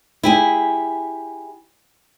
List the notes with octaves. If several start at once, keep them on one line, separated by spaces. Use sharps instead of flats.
E4 G4 G#4